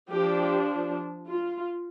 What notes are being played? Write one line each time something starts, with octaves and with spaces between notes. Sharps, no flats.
F3 D4 G4
F4